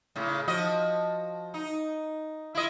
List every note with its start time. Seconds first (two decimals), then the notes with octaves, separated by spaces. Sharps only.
0.16 A2 C#3
0.48 F3 F#4 D#5
1.54 D#4
2.55 E4 F4 D#5